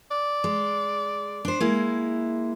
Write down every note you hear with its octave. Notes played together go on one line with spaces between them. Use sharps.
D5
G#3
D4 C5
G#3 A#3 E4